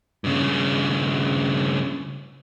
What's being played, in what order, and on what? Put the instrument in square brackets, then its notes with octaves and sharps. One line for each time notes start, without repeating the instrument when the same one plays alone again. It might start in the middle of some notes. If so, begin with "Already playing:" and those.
[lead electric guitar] G2 C#3